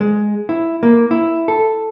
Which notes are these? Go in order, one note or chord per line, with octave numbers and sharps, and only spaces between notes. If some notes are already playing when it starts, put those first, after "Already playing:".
G#3
E4
A#3
E4
A4